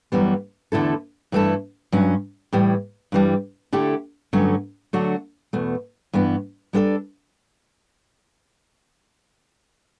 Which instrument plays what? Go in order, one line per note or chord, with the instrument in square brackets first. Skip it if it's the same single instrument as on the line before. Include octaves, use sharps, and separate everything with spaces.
[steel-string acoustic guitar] F#2 E3 G3 B3
E2 D3 A3 E4 A4
G2 E3 A3 E4 A4
G2 F#3 C#4
A2 E3 G3
G2 E3 G3
D3 A3 E4 G4
G2 D3 F#3 A3 C#4
D3 F#3 A3 D4 F#4
E2 B2 A3
G2 E3 B3
G3 B3 D4 A4 D5